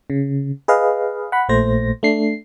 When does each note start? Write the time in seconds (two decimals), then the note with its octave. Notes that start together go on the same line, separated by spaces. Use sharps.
0.10 C#3
0.68 G#4 B4 D#5 F5
1.32 F#5 B5
1.49 A#1 A#2 A3 C5 A#6
2.03 A3 D4 C7